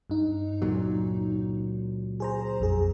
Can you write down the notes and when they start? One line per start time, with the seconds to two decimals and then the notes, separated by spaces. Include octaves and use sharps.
0.10 G2 D#4
0.62 C#2 A#2 F#3
2.20 G#4 C5 A#5
2.59 A#1 F2 G#4